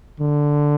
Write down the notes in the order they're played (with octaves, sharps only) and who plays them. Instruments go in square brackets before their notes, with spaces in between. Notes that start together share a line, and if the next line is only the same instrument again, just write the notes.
[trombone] D3